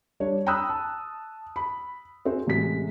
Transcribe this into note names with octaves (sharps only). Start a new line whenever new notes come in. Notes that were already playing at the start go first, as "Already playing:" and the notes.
G3 D4 C#5
G5 A#5 B5 D#6 E6 F#6
A5
B5
C4 F#4 G#4 C5
A1 C3 G#3 B6